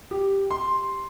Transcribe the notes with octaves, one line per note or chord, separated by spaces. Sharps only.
G4
C6